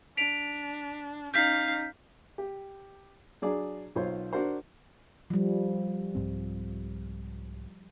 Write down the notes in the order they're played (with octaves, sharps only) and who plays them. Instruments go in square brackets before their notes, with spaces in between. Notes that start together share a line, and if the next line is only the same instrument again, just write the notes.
[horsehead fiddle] D4 [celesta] B6 D7 F7
[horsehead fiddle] C#4 D#4 [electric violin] F5 [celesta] G6 B6
[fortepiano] G4
F#3 D4 G#4 D5
B1 F4 C5 C#5
D4 F#4 A#4 C5
[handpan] F3 G3
[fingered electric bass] C2 G#2 C4